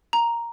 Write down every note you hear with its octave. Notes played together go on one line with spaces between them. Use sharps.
A#5